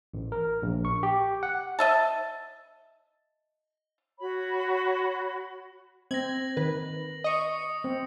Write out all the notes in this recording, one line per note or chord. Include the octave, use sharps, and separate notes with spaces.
A1
A#4
A#1
C#6
G4
F#5
D#5 E5 A5
F#4 C#5 B5
C4 G#6 A#6 F#7
D#3 B4
D#5 C#6 D#6 C#7
C4